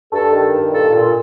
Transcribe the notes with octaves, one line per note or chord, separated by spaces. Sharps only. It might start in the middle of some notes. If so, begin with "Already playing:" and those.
G2 A4
D#3
G2
A#2 A4
A#2